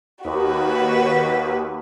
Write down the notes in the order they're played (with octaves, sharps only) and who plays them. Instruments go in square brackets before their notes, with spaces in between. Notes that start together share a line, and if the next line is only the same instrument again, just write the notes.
[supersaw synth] D#2 [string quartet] F#4 B4